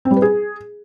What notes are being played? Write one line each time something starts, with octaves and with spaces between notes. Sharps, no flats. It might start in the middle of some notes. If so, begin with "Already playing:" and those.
C4
G3
B4
G#4